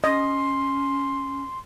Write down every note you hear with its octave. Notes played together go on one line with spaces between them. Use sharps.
C#4 D#5 C6